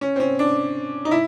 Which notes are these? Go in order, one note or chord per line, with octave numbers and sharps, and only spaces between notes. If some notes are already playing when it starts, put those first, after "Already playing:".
C#4
C4
C#4
D4
D#4
E4